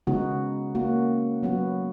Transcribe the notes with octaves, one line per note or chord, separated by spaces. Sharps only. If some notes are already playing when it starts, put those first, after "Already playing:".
C#3 G#3 B3 D#4 F#4
A#3 C#4 F#4
F#3 B3 F#4